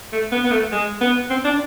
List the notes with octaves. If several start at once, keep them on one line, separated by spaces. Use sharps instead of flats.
A3
B3
B3
A3
G#3
B3
C4
D4